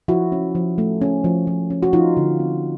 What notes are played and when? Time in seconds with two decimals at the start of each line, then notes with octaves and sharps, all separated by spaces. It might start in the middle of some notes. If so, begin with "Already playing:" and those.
0.08 F3 E4 F#4
0.32 C#4
0.55 F3
0.78 A3
1.02 C#4
1.24 F3
1.47 F3
1.70 C#4
1.83 F#4
1.93 F3 D#4 F4
2.17 D3
2.39 C4